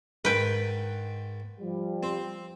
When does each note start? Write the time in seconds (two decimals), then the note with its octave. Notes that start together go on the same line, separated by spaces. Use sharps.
0.25 G#2 D#3 B4 G5
1.60 F3 G3
2.03 C4